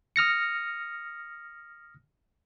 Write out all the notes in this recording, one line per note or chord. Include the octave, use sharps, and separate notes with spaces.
D#6 F6 A#6 C#7